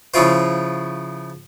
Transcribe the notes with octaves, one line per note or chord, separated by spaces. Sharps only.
C#3 F3 C#4 E4 F4 C5